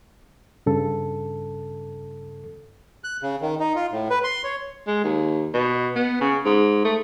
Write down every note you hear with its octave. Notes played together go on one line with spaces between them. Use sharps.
G2 C#3 A4
F#6
C#3
D#3
D#4
F4
A2
B4
C6
C#5
G#3
D#2
B2
B3
C#3
G#2
A3